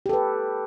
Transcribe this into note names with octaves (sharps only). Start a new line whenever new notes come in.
G4 A4 B4